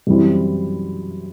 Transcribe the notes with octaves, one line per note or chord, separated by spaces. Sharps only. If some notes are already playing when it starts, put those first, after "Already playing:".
F#2 E3 G3 C4 E4